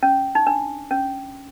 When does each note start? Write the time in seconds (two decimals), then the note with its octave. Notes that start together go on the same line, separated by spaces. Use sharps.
0.03 C#4
0.35 D#4
0.47 D4
0.91 C#4